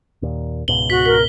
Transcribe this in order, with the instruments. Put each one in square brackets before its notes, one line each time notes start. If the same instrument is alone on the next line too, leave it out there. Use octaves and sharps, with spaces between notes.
[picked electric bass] D#2 A#2
[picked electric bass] C#2 G#2 B2 [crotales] F#7 G7
[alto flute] F#4 [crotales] B6
[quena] A#4 [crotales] B6